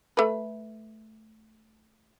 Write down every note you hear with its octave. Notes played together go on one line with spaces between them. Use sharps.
A3 B4